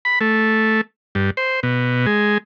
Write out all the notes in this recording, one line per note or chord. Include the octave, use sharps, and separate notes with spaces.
B5
A3
G2
C5
B2
G#3